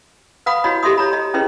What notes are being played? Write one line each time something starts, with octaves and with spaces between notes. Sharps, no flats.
B4 F5 F#5 B5 D#6
E4 F#4 C#5 D#5 B5
G4 A4 D#5 E5 C6 D#6
C#5 A#5 B5
D#5
C#4 E4 G#4 B4 D#5